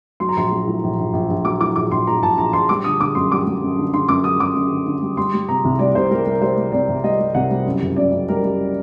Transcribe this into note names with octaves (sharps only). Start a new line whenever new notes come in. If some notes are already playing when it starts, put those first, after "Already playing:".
F#3 C6
A#5
A#1 C6
F#3
A2
A#1
A#1
A#1
A#1
F#3 D6
A2 D6
A#1 D6
A#1 C6
A2 A#5
A#1 A5
A#1 A#5
A#1 C6
G3 D6
D3 D#6
D3 D6
F#2 C6
G3 D6
G3
F#2
D3
D3 C6
F#2 D6
F#2 D#6
F#2 D6
F#2
D3
D3
G3
G3 C6
G3
C3 A#5
C2
G3 D5
C3 C5
G3 A#4
G3 A#4
G3 C5
G3
C3 D5
C2
G3 D#5
G3
C2 F#5
G3
F#2
F#1
F#2 D5
F#2
G3 A#4
G3